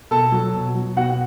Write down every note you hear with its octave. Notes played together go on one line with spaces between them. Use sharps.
B2 A4 A5
F#3
B2
F#3
B2 F#4 F#5